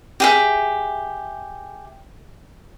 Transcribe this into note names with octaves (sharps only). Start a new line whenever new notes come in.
G4 G#4 E5